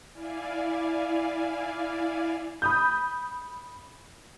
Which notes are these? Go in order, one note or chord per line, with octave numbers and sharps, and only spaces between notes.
E4 D5 F5 G#5
B5 D#6 G6